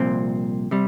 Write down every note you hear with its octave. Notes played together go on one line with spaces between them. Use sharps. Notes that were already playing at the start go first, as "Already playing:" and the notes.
Already playing: C2 A#2 F3 C4
C3 G3